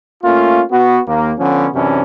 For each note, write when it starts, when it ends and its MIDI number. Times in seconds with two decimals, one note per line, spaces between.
0.23 0.62 57
0.23 0.62 58
0.23 0.62 61
0.23 0.62 65
0.71 0.99 59
0.71 0.99 66
1.08 1.32 39
1.08 1.32 58
1.39 1.67 50
1.39 1.67 53
1.39 1.67 59
1.39 1.67 61
1.73 2.02 42
1.73 2.02 48
1.73 2.02 52
1.73 2.02 61
1.73 2.02 62